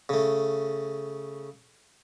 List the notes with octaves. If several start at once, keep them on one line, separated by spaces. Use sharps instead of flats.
C#3 A3